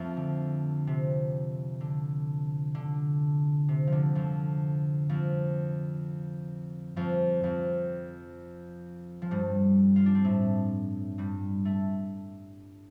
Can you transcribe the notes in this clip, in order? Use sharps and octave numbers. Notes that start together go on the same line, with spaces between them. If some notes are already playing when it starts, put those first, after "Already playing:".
Already playing: F2 F3 A3 C4
D3
C3
D3
D3
C3
F3
D3
F2 F3
F2 F3
F2 F3
F2 F3
F3
G2 G3
F4
D4
C4
A2 A3
G2 G3
A3